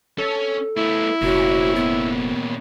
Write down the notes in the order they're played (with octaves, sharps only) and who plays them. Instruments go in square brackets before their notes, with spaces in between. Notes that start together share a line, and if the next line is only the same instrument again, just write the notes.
[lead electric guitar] C#4 [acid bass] A4
[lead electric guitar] A3 B3 [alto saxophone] E4
[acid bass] F1 [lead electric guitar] A#2 C#4 [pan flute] F#4
[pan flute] B3